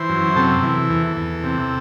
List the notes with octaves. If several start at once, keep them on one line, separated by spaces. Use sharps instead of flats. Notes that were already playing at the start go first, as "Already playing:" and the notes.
Already playing: E3 C5
F#2
C3 A4
E3
E2
E2
C3